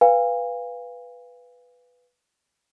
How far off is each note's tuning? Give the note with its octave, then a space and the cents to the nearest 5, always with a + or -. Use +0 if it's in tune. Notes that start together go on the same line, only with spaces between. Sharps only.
B4 +0 F5 -5 G#5 -35